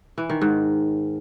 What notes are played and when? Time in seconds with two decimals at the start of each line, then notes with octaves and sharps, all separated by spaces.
0.18 E3
0.30 D#3
0.41 G#2